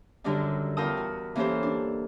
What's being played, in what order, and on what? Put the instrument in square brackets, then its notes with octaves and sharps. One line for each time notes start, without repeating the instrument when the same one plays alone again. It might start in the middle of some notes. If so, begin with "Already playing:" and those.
[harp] F#2 D3 D#3 G3 D4 D#4
E2 F4 A#4 G5 A5 D#6
F#4
E3 A#3 C#4 G4 A4 C5
D4